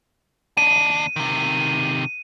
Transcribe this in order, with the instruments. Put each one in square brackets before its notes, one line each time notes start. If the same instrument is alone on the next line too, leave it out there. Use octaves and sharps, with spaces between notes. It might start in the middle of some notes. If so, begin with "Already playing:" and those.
[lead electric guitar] D#2 D4 [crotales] D#7
[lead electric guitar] C3 D#3